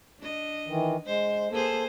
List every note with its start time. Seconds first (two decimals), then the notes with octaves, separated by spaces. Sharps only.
0.20 D4 D#5
0.68 D#3 E3
1.06 G#3 C5
1.51 A#3 G#4 A4 C5